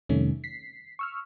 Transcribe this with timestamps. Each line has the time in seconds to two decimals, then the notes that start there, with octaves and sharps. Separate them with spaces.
0.09 F2 C3 D#3 G3 A3 C#4
0.44 B6 C7
0.99 C#6 E6 F6